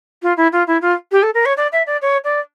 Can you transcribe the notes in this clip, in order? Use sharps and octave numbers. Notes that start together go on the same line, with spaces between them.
F4
E4
F4
E4
F4
G4
A4
A#4
C#5
D5
E5
D5
C#5
D5